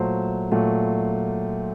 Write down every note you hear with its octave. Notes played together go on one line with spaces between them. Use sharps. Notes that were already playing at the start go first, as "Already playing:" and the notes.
Already playing: A#2 F#3 A3 C5
A#2 F#3 A3